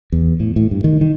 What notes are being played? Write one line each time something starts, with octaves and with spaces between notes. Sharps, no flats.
E2
A2
A2
G2
D#3
D#3